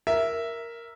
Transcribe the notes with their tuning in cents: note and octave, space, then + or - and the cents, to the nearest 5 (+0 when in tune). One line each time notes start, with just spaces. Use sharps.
A#4 +0 E5 +0